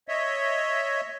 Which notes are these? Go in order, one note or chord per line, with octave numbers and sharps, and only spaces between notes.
C#5 D#5 E5